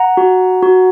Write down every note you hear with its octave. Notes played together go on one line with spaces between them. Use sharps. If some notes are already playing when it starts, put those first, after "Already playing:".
Already playing: F#5 A#5
F#4
F#4